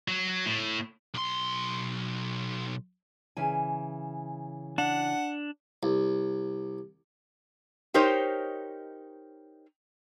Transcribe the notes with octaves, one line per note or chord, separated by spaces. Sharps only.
F#3
A2
B1 C6
C#3 E3 G#5
D4 F#5
C2
D#4 G4 A#4 C5 C#5 D#5